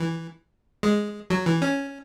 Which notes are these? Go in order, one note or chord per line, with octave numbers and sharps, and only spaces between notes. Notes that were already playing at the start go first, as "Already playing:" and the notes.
Already playing: E3
G#3
F#3
E3
C#4